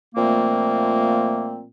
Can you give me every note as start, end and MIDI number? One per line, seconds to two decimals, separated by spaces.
0.15 1.65 46
0.15 1.65 53
0.15 1.65 57
0.15 1.65 58
0.15 1.65 60